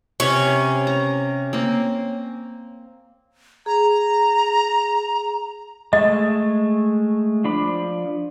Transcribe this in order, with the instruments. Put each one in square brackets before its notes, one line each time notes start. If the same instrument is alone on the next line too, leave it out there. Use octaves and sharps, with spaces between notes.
[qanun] C3 B4 [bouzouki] C#4
[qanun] A#5
A#3 C4
[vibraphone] G#4 [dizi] A#5
[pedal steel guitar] G#3 A3 [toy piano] D#5
[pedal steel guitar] F3 D4 B5